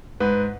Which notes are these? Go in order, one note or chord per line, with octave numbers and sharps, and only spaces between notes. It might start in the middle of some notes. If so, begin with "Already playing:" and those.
G#2 B4